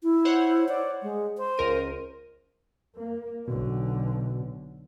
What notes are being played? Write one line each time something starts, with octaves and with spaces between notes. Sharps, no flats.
E4
C5 C#5 F#5
D5
G#3
C5
C#2 A#4 D#7
A#3
B1 B2 D3